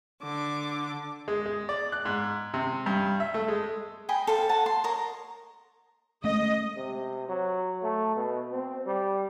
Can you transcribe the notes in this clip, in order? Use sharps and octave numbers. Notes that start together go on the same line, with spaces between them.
D3 D6
G#3
G#3
D5
F#6
G#2
C3
G2
E5
A3
G#3
D#5 G5 G#5 B5
A4 C5 F5 G5
F#4 F#5 A5
C6
A#4 C#5 D#5
G#3 A3 C#4 D#5
C3
F#3
A3
B2
C4
G3